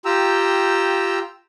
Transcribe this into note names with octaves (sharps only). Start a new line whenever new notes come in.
F4 G4 G5 A#5 E6